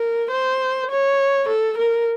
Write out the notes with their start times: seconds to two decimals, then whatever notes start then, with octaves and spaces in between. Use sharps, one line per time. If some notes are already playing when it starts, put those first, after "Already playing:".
Already playing: A#4
0.31 C5
0.91 C#5
1.48 A4
1.77 A#4